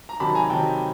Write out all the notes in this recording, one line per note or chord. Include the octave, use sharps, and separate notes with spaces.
A#5
C3 D#3 F#3 A5 B5
G#5 A#5
C3 D#3 F#3 G5 A5